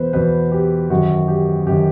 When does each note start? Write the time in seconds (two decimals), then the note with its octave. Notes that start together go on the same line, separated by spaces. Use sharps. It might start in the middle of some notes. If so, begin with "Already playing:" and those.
Already playing: E2 B2 B4 C5
0.13 E2 B2 B4
0.52 G4
0.90 F#2 D#3 F#4
1.28 G4
1.67 F#2 D#3 G4